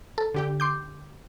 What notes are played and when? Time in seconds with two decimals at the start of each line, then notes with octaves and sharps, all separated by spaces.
0.18 A4
0.34 D3 G4 G5
0.60 C6 D6 G6